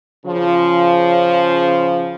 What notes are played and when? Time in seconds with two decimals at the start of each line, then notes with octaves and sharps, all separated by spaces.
0.25 C#3 F3